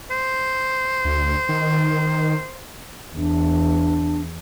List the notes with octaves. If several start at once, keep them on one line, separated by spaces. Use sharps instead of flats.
C5
D2
D#3
E2 D4